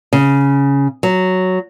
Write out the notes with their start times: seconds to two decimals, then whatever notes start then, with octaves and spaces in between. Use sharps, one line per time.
0.13 C#3
1.03 F#3